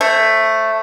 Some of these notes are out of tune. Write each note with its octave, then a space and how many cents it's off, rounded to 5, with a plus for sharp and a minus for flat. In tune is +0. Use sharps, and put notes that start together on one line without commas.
A3 +5 C5 +25